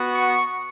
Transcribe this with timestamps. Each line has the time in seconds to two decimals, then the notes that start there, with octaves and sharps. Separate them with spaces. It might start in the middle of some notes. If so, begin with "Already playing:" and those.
Already playing: B3 F#4
0.11 C#6